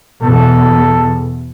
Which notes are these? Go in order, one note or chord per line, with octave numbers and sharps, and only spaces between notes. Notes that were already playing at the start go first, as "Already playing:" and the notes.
E2 B2 A4